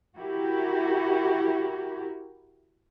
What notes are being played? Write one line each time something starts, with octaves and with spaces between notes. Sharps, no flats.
E4 F#4 G4 A#4